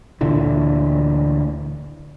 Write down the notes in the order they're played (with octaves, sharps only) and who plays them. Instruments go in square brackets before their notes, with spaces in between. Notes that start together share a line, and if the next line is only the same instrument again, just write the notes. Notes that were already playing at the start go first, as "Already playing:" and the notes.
[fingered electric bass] D2 A#2 D3 E3